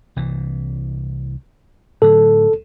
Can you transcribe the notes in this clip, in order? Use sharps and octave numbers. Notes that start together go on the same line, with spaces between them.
C2 E3
A2 D3 F#3 A4